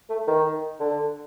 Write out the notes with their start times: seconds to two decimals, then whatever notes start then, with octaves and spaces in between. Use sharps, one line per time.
0.10 A3
0.27 D#3
0.80 D3